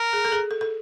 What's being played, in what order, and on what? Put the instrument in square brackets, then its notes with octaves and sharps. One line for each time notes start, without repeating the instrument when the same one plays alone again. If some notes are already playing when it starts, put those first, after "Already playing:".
Already playing: [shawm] A#4
[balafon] G#4
A4
G#4
A4
A4